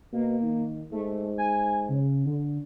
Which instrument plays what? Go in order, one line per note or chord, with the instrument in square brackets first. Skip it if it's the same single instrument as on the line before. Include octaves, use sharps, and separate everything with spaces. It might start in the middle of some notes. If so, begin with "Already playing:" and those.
[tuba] B2 [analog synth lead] A#3
[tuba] D#3
[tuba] G#2 [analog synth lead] A3
[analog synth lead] G#5
C#3
D3